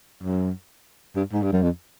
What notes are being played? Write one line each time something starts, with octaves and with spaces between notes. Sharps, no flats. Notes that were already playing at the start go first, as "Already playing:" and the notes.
F#2
G2
G#2
G2
F#2
F2